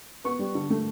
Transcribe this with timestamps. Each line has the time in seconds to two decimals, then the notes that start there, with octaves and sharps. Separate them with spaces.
0.24 B3 C#6
0.39 G3
0.55 D3
0.70 A3